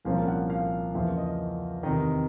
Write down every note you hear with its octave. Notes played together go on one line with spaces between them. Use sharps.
C2 A#2 F3 A#3 C#4 F5
F#5
F5
E2 C#3 F3 A#3 E5
D#5
E2 C3 D#3 D#5